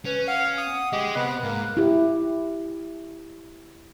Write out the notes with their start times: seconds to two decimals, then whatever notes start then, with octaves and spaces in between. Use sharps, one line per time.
0.05 C#4 B4
0.28 F5 F#5
0.58 D#6
0.93 G#3 G4 D#5
1.15 C3 B3 F#6
1.43 G#2 A#3
1.77 E4 G4